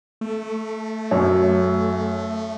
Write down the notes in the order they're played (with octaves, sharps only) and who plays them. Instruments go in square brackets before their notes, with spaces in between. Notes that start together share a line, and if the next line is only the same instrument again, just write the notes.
[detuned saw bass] A3
[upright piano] F#2 C#5